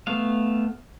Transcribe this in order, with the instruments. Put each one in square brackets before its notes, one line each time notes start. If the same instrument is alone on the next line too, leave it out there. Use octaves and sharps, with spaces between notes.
[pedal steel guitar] A3 B3 F5